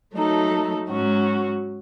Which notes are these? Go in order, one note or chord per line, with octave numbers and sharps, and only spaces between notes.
F#3 A3 D#4 A4
G#2 F#3 C#4 F#4